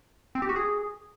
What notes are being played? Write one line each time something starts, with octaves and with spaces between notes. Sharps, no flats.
C4
G4
F#4
G#4